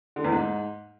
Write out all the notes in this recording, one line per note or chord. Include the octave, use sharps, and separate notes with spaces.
D3
E2
G#2